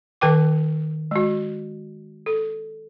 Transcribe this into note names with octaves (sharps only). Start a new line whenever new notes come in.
D#3 B4 G5 D6
G#3 F#4
A4